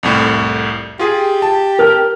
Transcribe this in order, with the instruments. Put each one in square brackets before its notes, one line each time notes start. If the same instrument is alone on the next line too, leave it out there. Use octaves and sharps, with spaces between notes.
[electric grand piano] C2 F2 A2
[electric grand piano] F4 G#4 [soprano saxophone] G4
[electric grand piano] A5
[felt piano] A#4 F6